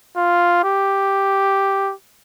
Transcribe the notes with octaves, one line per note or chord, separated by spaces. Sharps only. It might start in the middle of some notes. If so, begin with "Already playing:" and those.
F4
G4